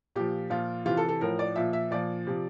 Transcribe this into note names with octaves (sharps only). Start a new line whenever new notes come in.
A#2 F3 G4
A#2 F3 F4
C3 E3 F4
A4
A4
A2 F3 A#4
D5
A#2 F3 E5
E5
A#2 F3 D5
C3 F3